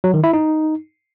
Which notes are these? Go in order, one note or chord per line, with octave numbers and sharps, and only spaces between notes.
F#3
D#3
E4
D#4